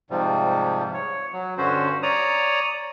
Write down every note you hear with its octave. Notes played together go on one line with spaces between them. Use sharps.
G#2 C3 F3 G3
C#5
F#3
G2 D3 C#4 F#4 C5
C#5 D5 A#5 D#6